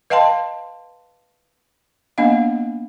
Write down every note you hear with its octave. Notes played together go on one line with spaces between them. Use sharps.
B4 D#5 F5 G5 A5 C6
A#3 B3 D4 D#5 F5